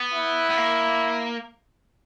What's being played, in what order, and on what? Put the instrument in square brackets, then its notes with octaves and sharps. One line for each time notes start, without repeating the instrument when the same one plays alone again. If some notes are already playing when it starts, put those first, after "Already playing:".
Already playing: [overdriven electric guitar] B3
[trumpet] E4
[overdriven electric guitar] B3
A#3